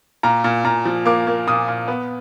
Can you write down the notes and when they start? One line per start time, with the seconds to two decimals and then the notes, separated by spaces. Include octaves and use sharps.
0.23 A#2 A#5
0.44 A#2
0.64 A#2 A#5
0.85 F3
1.05 A#3 D6
1.27 A#3
1.47 A#2 D#6
1.68 A#2
1.88 B3